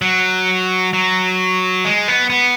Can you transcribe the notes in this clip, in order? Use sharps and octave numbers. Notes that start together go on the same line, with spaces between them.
F#3
F#3
G#3
B3
B3